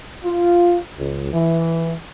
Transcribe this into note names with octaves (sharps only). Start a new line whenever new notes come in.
F4
C#2
E3